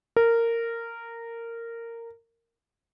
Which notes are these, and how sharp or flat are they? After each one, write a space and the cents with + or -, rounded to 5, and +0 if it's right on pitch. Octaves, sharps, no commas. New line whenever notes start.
A#4 -15